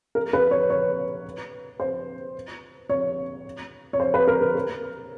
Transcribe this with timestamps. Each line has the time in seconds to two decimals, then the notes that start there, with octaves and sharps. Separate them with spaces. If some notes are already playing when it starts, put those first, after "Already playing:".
0.15 A#4
0.33 B4
0.51 C#5
0.70 C#5
1.80 C5
2.90 C#5
3.93 C#5
4.00 C5
4.14 B4
4.28 A#4
4.41 A#4
4.55 A#4